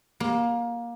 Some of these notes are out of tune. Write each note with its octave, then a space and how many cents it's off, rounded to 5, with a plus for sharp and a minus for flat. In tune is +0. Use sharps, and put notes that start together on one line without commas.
A#3 +20